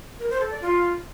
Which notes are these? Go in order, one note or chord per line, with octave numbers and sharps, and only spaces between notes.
A#4
C5
A4
D5
F4